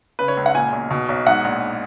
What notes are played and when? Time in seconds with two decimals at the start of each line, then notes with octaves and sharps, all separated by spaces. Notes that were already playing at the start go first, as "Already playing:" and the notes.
0.19 C#3 B4
0.28 C#5
0.37 C#2
0.46 F#5
0.55 A#2 G#5
0.72 B1
0.91 B2
1.09 B1
1.27 G#2 F#5
1.44 A#1